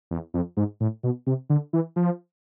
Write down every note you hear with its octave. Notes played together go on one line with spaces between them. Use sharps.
E2
F2
G#2
A2
B2
C3
D3
E3
F3